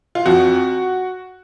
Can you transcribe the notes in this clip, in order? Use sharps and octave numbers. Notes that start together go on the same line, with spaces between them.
F4
F2 F3 F#4